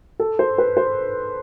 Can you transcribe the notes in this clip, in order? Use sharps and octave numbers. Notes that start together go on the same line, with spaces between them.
A4
C5
B4
C5